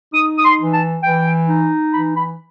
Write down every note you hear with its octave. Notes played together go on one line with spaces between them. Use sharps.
D#4 D#6
D#6
C6
E3
A5
E3 G5
D#4
E3 B5
B5